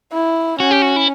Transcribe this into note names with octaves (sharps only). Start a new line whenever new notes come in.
E4
C#4 F#4
G4
F#4
E4